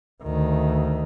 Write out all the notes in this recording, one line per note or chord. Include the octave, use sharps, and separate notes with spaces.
D2 D#3